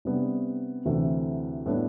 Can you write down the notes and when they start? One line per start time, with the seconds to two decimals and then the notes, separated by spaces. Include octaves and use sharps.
0.05 C3 G3 B3 D4
0.85 D2 C3 E3 A3 E4
1.66 A2 G3 B3 D4